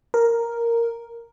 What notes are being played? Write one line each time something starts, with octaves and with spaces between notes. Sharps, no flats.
A#4